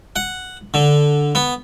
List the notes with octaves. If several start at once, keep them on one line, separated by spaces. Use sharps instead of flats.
F#5
D3
B3